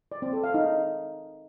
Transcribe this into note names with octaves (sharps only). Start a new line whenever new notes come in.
D5
C4
A4
F5
D#4